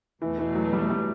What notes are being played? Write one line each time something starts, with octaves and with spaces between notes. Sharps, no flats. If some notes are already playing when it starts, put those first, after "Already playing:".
E2 B2 E3 A3
E3
F#3
G3
G3